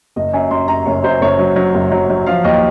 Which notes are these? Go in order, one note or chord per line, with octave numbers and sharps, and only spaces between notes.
F#1 D#5
F#2 G#5
F#2 C6
F#2 A#5
F#1 C#5
F#2 C5
F#1 C#5
F#3
F#3
F#1
F#3
F#3
F3 F5
D#2 D#5